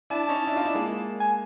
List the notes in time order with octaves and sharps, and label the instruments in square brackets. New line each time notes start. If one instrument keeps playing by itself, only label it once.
[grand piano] D4 E4 [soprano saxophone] A5
[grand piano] C#4 D#4
D4 E4
D#4 F4
D4 E4
G#3 A#3
[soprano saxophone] G#5